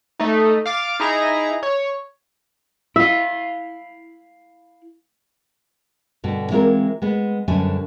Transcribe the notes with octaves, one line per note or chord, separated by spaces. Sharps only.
A3 D#4
F5 D6 A6
D#4 E4 G#4 A#5
C#5
E4 E5 F5
G2 B2 D3
E3 G#3 C4 F4 A#4
G#3 B3
F#2 B2 D3 G3 D4 G#5